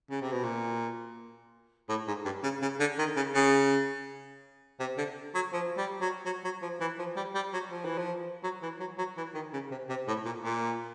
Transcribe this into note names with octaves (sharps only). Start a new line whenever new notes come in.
C#3
C3
B2
A#2
A2
G#2
G2
C#3
C#3
D3
D#3
C#3
C#3
C3
D3
F#3
F3
G3
F#3
F#3
F#3
F3
E3
F3
G3
G3
F#3
F3
E3
F3
F#3
E3
F#3
F#3
E3
D#3
C#3
C3
C3
A2
A#2
A#2